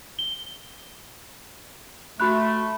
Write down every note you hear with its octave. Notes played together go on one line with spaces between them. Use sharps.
G7
A3 F#4 B5 F#6